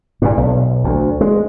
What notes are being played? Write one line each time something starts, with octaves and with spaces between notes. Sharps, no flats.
G2 A#2
B1
D2
G#3